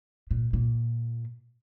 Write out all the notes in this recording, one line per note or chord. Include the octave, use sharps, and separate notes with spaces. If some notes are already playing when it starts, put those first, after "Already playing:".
A#2
A#2